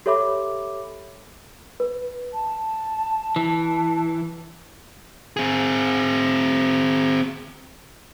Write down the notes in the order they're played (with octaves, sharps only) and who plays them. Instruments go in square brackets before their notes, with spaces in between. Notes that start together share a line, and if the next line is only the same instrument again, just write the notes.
[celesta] G4 A4 C#5 E5 B5 D6
B4
[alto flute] A5
[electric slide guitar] E3
[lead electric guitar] C4 G#4